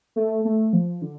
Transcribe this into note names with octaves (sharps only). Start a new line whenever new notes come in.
A3
A3
F3
D3